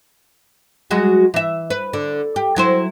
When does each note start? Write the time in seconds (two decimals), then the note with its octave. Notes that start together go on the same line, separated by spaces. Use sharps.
0.91 F#3 G#3 F#4
1.34 E3 E5
1.70 B4
1.93 D3
2.36 G4
2.56 F#3 E4 C5